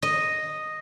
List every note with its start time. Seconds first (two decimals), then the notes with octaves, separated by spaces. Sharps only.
0.02 D#5